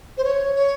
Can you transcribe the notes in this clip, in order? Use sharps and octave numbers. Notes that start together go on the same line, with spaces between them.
C5
C#5
C#5